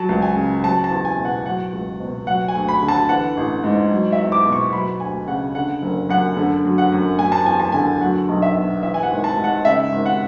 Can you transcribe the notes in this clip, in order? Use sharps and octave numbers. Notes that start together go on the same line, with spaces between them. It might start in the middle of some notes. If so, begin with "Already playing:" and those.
Already playing: F#3 A5
C#2
G#5
C#3
F#3 A5
A5
E2
G#5
B2
F#5
F#3 F#5
C#2
B2
F#3 F#5
G#5
D2
B5
D3
A5
E3 F#5
A1
G#2
F#3
E5
E2
D6
B2
C#6
F#3 B5
D2 G#5
C#3 F#5
D3 F#5
F#1
F#2 F#5
D3
F#3
F#5
F#2
F#3 G#5
A5
E2 G#5
A5
D3 G#5
F#3 F#5
B1
E5
B2
E3 E5
G#5
F#5
G#1
A5
G#2
F#5
C#3 E5
G#1
F#5